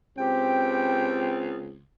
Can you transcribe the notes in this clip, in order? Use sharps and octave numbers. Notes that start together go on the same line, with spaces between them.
C#2 C4 G4 G5